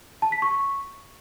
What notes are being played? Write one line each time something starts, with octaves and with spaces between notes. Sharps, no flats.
A5
B6
C#6